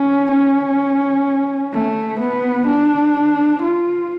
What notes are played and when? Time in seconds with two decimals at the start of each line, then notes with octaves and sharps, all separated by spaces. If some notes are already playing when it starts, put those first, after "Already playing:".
Already playing: C#4
0.31 C#4
1.73 A3
2.20 B3
2.67 D4
3.62 F4